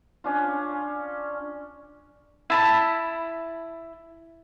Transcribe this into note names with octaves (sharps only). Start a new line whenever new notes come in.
C#4 D4 F4
E4 A5 B5